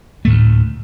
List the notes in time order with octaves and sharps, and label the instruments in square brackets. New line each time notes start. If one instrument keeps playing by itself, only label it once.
[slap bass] D2 A2 A3